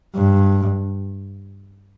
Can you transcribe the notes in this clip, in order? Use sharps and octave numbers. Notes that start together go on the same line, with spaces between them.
G2